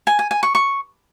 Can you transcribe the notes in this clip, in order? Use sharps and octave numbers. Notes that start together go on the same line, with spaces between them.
G#5
G#5
G#5
C#6
C#6